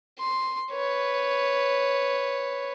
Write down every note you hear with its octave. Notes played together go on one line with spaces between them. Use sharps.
C6
B4 C#5